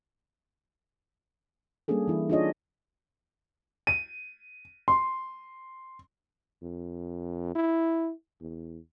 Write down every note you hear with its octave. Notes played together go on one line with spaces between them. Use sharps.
G3 A#3 C#4 D4 G#4 A4
E3 E4
D4 D#4 F4 G#4 C#5 D#5
D#7
C6
F2
E4
E2